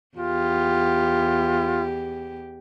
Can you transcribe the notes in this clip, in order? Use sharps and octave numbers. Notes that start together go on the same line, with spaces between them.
E2 F4 G4